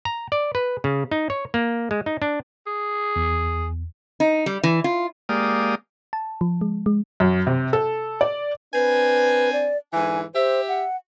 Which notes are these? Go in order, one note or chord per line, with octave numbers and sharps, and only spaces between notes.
A#5
D5
B4
C#3
D#4
C#5
A#3
G#3
D#4
D4
G#4
E2
D#4
G3
E3
F4
G#3 A#3 G4 D5 F5 D#6
A5
F3
G#3
G#3
F#2
C3
A4
D5
C4 D4 B4 G#5
D5
G#2 D3 E3 G#5
G4 C5 E5
F#5